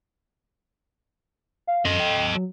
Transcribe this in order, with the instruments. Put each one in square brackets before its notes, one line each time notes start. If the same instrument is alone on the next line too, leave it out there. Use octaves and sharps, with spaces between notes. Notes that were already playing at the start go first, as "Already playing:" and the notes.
[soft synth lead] F5
[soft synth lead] F#2 [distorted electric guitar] A4 D#5
[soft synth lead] G5
F#3